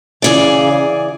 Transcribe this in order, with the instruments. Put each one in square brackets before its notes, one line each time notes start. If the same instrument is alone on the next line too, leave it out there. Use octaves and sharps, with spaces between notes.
[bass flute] C#3 [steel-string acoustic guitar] E3 G#4 D5